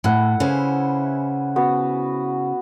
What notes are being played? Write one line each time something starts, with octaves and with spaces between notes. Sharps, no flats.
A2 E4 F#5
C#3 B4 C5 G#5
B3 F#4 B4